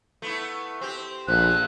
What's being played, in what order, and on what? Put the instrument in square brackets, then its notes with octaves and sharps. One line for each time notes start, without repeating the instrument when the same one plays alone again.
[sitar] A3 B3 E4
C4 G4
[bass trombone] A#1 [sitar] F2 C3 F3 [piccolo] F#6